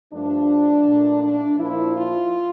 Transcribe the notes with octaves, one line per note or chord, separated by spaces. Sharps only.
G2 F3 A3 D4
A#2 A3
D4
A#2 F3 A#3 E4
F4